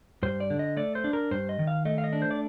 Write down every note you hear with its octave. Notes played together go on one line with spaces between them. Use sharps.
G2 C5
D5
D3
D#5
A3 D5
C5
D4
A#4
G2 C5
D#5
D#3
F5
A3 D#5
F5
D#5
D4
C5
D5